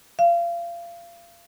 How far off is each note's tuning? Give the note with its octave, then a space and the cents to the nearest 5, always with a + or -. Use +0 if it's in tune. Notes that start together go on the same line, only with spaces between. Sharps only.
F5 -30